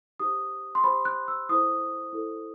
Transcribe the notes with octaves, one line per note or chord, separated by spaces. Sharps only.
D#4 G4 C5 D#6
C6
D#4 G4 C5 B5
F#6
E6
E4 A4 C5 D#6
E4 A4 C5